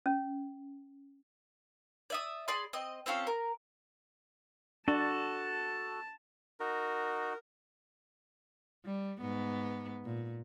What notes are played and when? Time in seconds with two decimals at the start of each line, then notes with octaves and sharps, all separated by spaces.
0.06 C#4
2.10 D5 E5 D#6
2.48 G#4 D5 B5 C6
2.73 C4 D#5
3.06 C4 C#4 F4 A4
3.27 A#4
4.88 D4 F#4 A4 A5
6.60 D#4 F#4 A#4
8.85 G3
9.21 G#2 B3
10.05 A#2